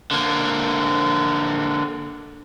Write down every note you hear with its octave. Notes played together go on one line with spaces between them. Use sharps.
D3 A#3